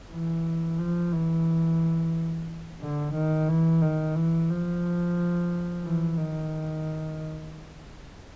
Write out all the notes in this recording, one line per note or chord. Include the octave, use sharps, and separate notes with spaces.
E3
F3
E3
D3
D#3
E3
D#3
E3
F3
E3
D#3